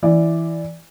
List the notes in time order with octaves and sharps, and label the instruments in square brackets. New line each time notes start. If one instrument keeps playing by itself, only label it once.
[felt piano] E3 D5